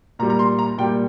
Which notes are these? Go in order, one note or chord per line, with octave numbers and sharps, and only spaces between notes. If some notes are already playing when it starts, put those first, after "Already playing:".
A#2 G3 A#5
A#5
C6
A#5
A#2 G3 G5